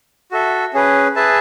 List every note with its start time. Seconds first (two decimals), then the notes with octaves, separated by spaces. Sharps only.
0.31 F#4 A4 E5
0.73 C#4 G#4 B4
1.16 G#4 B4 E5 A5